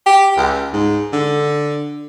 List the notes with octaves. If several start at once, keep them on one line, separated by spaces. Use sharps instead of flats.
G4
C#2
G#2
D3